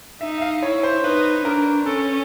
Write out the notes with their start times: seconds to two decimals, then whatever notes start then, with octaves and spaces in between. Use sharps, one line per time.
0.21 D#4 E5
0.38 E5
0.41 F5
0.62 E4 C#5
0.83 C5
1.04 D#4 B4
1.45 D4 A#4
1.86 C#4 A4